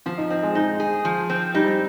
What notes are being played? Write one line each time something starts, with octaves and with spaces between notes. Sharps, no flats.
F3 C4
D#4
C4 D#4
G#3
G#3 D#4
G#4
F3
C4
G3 D#4